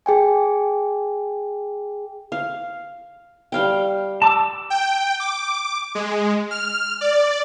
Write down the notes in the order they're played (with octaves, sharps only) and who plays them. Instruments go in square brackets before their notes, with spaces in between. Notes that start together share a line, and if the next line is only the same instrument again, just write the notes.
[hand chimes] G#4 G5 G#5
[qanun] F5
G3 F5 G5
[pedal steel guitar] A5 D6 E6
[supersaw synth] G5
D6
G#3
F6
D5